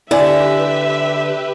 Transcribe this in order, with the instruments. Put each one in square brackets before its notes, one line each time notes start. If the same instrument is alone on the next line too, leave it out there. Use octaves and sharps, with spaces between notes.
[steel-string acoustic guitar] D3 [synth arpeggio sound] E4 D5 G#5 [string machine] G4 B4 [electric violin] E5